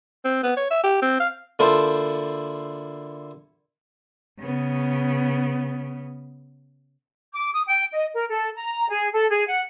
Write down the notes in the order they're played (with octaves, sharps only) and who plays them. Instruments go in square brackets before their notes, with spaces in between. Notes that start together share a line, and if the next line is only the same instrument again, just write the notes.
[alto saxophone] C4
B3
C#5
E5
G4
C4
F5
[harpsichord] D3 A#3 E4 F4 A4 C5
[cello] C#3 B3
[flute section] D6
D#6
G5
D#5
A#4
A4
A#5
G#4
A4
G#4
F#5